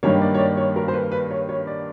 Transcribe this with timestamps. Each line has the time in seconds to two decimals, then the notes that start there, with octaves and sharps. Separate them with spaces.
0.03 G2 D#3 G3 A#3 C#5
0.22 D5
0.34 C#5
0.39 D5
0.57 C#5
0.76 A#4
0.88 C5
0.94 B4
1.12 B4
1.31 C#5
1.49 C#5
1.67 D5